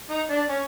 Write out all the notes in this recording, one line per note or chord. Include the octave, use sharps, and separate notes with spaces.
D#4
D4
C#4